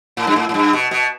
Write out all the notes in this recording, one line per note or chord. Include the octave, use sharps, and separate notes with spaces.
A2
G2
A2
A2
G2
B2
B2